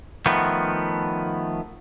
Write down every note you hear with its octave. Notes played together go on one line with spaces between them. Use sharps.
D#3 F3 A3 B3